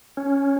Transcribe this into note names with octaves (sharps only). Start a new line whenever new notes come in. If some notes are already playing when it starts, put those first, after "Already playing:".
C#4